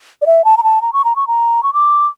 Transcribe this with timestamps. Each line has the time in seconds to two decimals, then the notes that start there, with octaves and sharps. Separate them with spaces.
0.22 D5
0.26 E5
0.45 A5
0.57 A#5
0.63 A5
0.82 A#5
0.93 C#6
1.05 A#5
1.16 C#6
1.27 A#5
1.63 C#6
1.73 D6